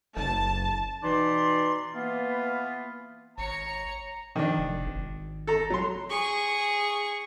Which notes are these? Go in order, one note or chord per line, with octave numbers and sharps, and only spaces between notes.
F#1 A5
B2 E3 D#4 D5 C6
E3 A#3 B3 F4 B4
G#1 C#5 A#5 C#7
D#3 F3 D4
F1
G#1
A4 A#5
F#3 C6
G#4 C#6